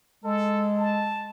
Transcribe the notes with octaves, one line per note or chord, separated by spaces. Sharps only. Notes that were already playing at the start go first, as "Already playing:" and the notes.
G#3 A4
A5